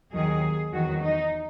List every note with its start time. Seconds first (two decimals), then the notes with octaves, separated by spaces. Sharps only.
0.12 D#2 D#3 F#3 G#4
0.71 E2 D#3 F#3 F#4
1.01 D#4